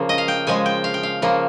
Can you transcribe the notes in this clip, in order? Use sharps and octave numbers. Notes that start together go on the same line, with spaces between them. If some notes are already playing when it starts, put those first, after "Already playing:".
Already playing: C#3 F3 A#3
D#5
F5
G5
C#3 F3 G#3 G#5
G5
F5
G5
F5
C#3 F3 A#3